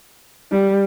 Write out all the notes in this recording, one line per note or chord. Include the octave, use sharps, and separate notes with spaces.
G3